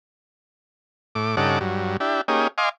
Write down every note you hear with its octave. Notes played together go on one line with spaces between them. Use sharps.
A2 D6
G2 C#3 D#4 A4 F#5 D6
G2 F#3
D4 E4 G4
A#3 C#4 D#4 G4 G#4
D#5 F5 G#5 C6 D6